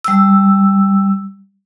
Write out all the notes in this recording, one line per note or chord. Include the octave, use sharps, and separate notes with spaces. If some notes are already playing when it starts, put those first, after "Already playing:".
G3 E6